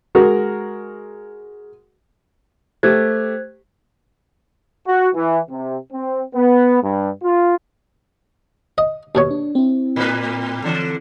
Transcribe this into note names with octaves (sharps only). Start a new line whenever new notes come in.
G#3 F#4 A#4
A3 G4 C5 F#6 G#6
F#4
E3
C3
C4
B3
G2
F4
D#5
D#2 B2 C#5
D4
C4 E4
A2 B4
D3 E3